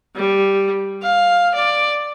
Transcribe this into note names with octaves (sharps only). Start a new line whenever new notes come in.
G3
F5
D5